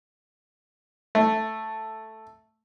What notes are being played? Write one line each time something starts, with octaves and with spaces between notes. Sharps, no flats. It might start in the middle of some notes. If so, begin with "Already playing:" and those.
A3